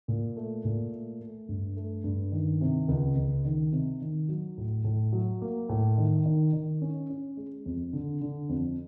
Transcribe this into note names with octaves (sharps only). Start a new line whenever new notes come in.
A#2
A3
A#2
A3
A3
G2
A3
G2
D#3
C3
C#2
C#2
D#3
C3
D#3
F#3
A2
A2
F#3
A#3
A2
D#3
D#3
D#3
C#4
C#4
G#3
F2
D3
D3
F2